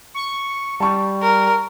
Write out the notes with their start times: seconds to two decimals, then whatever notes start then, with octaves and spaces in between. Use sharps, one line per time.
0.14 C#6
0.80 G3 A5 C#6
1.22 A#4